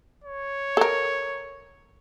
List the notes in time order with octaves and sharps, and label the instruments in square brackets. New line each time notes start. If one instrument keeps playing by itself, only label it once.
[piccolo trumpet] C#5
[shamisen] A4 A#4